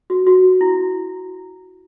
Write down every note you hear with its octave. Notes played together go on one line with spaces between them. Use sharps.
F#4
F#4
E4